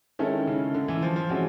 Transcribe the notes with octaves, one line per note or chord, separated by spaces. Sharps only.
D#3 G#3 C#4 E4 A4
C#3
D3
E3
F3
F3
E3 G#3 C#4 F#4